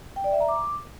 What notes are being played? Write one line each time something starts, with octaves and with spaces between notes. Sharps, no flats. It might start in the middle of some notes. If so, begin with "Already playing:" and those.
G5
D5
E5
A#5
D6